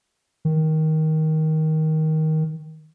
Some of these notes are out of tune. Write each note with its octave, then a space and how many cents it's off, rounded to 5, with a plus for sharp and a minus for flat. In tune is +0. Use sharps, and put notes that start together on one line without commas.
D#3 +15